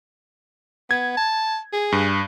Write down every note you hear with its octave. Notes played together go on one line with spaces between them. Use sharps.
B3 G#6
A5
G#4
G2